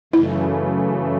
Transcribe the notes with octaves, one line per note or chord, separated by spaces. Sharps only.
F#2 C#3 E3 A3 E4